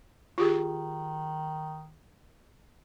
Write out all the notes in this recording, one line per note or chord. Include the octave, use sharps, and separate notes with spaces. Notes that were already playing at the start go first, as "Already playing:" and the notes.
D#3 F4 G4 G#4